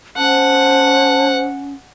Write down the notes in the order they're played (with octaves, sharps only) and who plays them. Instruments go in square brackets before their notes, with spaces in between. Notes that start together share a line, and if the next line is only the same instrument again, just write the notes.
[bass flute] C#4 [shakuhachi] C5 [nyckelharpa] F#5 [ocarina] A5